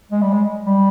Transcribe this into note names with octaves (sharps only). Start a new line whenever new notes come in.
G#3
G3
G#3
G3